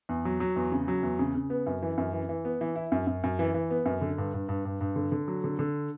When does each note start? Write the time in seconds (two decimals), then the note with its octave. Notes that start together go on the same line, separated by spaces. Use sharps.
0.09 E2
0.25 F#3
0.40 F#3
0.56 E2
0.72 C#3
0.88 F#3
1.03 E2
1.19 C#3
1.35 C#3
1.50 B3
1.67 F#2
1.82 E3
1.98 F#2
2.13 E3
2.29 E3
2.45 B3
2.61 E3
2.76 E4
2.92 F#2
3.07 F#2
3.24 F#2
3.39 E3
3.54 E3
3.70 B3
3.86 F#2
4.01 D3
4.18 G2
4.34 G2
4.49 G2
4.65 G2
4.81 G2
4.96 D3
5.12 D3
5.28 F#3
5.44 D3
5.59 D3